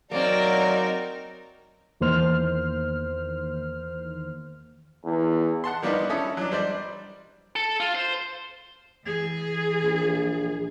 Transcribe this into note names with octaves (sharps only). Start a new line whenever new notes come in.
F#3 A#3 C4 D#4 A#4 D5
E2 D#3 A#3 C5 F6
E2
F#5 A5 C6
D#3 G3 A#3 B3 D4 D#4
C#4 A4 E5 D#6
F#3 D4
G3 C5 D5
A4
F4
C5
E3 G#4
A#1